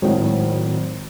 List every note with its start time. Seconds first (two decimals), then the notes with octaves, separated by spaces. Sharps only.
0.02 G#1 A2 D#3 F#3